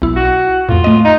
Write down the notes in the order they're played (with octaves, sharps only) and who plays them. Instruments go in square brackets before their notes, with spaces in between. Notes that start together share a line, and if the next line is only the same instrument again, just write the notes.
[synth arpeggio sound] B1 E4
[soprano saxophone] F#4
[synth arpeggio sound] F2 A2 [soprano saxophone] F4
[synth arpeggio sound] A3 D#5
[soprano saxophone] D#4